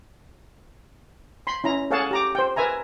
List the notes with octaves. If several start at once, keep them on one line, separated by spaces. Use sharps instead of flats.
B5 C6
C#4 E4 A#5
G#4 A4 C#5 F5 F#5 A5
G4 A#5 D6
C5 G5
A#4 B4 E5 G#5 A#5